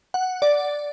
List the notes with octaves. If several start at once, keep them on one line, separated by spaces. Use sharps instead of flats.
F#5
D5